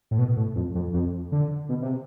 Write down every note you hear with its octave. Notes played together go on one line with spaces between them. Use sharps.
A2
B2
A2
F2
F2
F2
D3
B2
C3